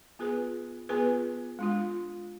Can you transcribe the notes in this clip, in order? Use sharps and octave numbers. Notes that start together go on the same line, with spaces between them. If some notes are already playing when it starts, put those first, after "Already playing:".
B3 F4 G#4 B4
B3 F4 G#4 B4
G#3 D4 F4